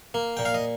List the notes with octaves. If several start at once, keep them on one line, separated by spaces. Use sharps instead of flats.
A#3
A#2 G5
F5
D#5